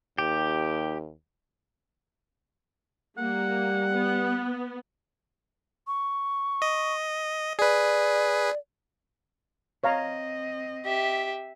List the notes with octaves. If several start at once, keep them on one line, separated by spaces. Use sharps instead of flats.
D#2 G4
G3 A#3 F#5
B3
C#6
D#5
G#4 B4 D5
C4 C#5 D#5 F5 A#5
G4 E5